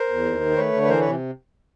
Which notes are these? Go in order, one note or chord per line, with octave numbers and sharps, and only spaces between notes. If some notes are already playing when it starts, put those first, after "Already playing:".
Already playing: A#4 C5
E2
D#2
D#3
A3 B4 C#5
D3
B4
E3 A#4 C5
C3 B4 C#5